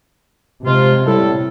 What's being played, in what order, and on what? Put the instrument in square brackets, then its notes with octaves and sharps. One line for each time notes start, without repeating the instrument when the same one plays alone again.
[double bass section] C3 [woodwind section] F3 G#3 F4
[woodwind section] A2 G3 A4